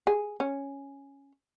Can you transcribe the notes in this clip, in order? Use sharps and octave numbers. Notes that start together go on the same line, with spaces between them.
G#4
C#4